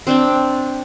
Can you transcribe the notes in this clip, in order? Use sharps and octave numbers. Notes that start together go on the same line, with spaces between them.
C4 D4 G5